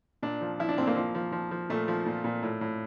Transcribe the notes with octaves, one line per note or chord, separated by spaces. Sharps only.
A#2 D4
F3
F3 E4
D4
A#2 C4
A#3
F3
F3
F3
F3
A#2 A3
F3
A#2
A#2
A2
A2